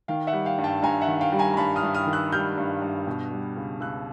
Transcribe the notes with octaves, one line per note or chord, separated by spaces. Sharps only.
D#3 F5 G5
E5 F#5
G3
F5 G5
G2
G5 A5
G2 G#5 A#5
E5 F#5
D#3
F5 G5
G3
G#5 A#5
A#5
G2 A5 B5
D#6 F6
G2
D#6 F6
D#3
E6 F#6
G3 F6 G6
G2
G2
B2
G3
C#2
C#2 E6 F#6